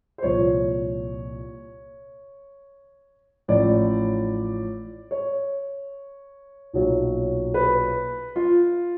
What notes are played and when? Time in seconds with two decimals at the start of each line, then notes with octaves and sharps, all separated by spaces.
0.18 C5
0.23 C2 A#2 F3 C#5
3.48 A1 A2 F3 D5
5.11 C#5
6.73 B1 A#2 F#3
7.54 B4
8.36 F4